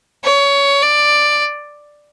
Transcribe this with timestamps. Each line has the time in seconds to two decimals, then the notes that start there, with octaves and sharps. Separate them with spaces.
0.24 C#5
0.82 D5